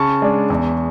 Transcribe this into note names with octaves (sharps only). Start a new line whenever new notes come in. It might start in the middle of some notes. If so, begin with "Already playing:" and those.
Already playing: C#3 A5 C#6
G#3 D4
E2